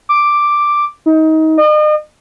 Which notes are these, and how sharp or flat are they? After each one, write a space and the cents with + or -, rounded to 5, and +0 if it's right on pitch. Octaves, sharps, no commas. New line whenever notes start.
D6 +5
D#4 +25
D#5 -40